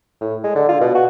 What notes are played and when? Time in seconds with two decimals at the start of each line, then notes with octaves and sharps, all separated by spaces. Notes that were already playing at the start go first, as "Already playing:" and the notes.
0.21 A2
0.44 G#3
0.56 D3
0.69 F4
0.81 B2
0.95 F#4